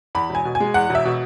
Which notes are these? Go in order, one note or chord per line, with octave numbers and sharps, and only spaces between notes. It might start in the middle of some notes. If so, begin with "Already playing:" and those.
E2 B5
E1 G#5
B2
G#5
G#3
E2 F#5
E1 E5
B2